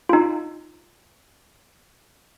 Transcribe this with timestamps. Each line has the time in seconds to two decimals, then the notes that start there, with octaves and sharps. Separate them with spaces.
0.09 D#4 F4